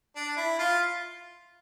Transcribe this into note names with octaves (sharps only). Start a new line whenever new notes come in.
D4
E4
F4